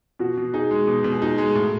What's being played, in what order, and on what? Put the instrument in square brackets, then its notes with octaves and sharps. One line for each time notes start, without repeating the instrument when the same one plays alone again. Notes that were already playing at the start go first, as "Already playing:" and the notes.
[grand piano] B2 [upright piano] F#4
[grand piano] B2
[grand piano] D#4 [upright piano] G#4
[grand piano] G#3
B2
B2
[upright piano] G#4
[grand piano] D#4 [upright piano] F#4
[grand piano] G#3
A2